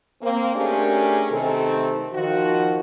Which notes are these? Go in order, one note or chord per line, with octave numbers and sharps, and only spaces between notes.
A#3 C4
A3 C#4 D4 G4 G#4 A#4
C3 D#3 A3 C4 A4
D#3 F3 F#4